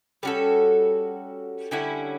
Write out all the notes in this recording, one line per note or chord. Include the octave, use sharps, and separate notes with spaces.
G3 C#4 F#4 A4
D3 G3 C#4 E4